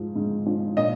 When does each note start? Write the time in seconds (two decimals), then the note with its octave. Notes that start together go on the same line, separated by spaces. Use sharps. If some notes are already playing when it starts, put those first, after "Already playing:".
Already playing: G#2 F3
0.15 G#2
0.46 F3
0.77 A#2 D#5